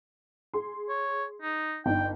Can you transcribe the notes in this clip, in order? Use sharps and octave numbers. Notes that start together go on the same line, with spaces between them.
G#4 C6
C#5
D#4
G1 D#4 G5